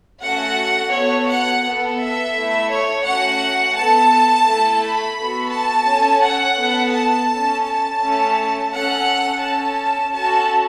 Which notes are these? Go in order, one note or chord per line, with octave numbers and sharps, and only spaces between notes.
A3 C#4 F#4 A4 F#5
B3 F#4 A4 C#5
F#5
B3 A4
E5
A3 E4 A4
C#5
A3 C#4 F#4 F#5
B3 A4 A5
A3 E4 A4
B5
B3 F#4 A4
A5
C#4 A4
F#5
B3 A4
A5
C#4 A4
A5
A3 C#4 A4
C#4 A4 F#5
C#4 A4 A5
C#4 F#4 A4 A5